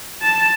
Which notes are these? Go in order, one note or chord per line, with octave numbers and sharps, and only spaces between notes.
A5